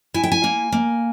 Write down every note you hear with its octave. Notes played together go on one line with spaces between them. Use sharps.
E4 G#5
G5
G#5
A#3
A#3